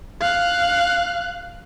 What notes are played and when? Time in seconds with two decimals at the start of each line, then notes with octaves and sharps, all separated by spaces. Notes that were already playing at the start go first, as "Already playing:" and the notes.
0.21 F5 F#6